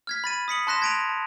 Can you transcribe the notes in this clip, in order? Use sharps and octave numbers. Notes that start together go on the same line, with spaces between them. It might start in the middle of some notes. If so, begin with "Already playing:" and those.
F6 G#6 B6
B5 A6 D#7
D#6 B6 C#7 F#7
A5 C6 F#6 A#6 B6 E7
G#6 A#6 D7 D#7 F7
A5